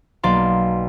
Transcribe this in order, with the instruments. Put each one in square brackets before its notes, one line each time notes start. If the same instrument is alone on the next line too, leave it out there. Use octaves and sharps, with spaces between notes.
[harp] B1 A#3 D5 F5 C6